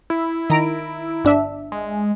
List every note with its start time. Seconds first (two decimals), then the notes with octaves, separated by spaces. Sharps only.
0.10 E4
0.50 D#3 A#5 D7
1.24 G1 D4 E5
1.72 G#3